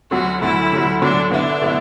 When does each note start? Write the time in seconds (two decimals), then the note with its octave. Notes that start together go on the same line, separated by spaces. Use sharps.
0.11 D2 D3 F#3 F#4
0.41 D2 D3 F#3 E4
0.72 D2 D3 F#3
1.01 D2 D3 F#3 D4
1.31 D3 B3 D4 E4
1.62 D3 B3 E4